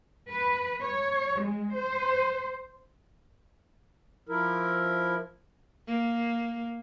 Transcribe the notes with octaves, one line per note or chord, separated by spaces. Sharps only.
B4
C#5
G#3
C5
F3 E4 A#4
A#3